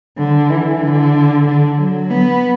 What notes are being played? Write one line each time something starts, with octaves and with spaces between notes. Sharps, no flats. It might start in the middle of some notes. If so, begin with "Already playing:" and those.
D3
E3
D3
D3
F#3
B3